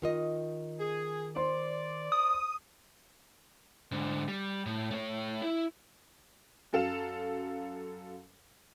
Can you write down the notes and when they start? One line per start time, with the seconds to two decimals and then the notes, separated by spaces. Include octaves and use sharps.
0.02 D#3 F4 D#5
0.80 G#4
1.36 C5 D5 C6
2.12 D#6
3.92 G#2 D3
4.28 G3
4.66 A2
4.91 A3 C#5
5.42 E4
6.73 F#2 F#3 A4 F5 E7